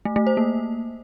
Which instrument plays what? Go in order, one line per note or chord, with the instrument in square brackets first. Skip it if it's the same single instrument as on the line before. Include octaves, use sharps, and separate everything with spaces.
[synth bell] A3
A3
C5
A#3